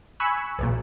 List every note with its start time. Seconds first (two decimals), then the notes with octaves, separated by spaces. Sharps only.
0.20 G#5 B5 C#6 E6 F#6
0.59 B1 E2 A#2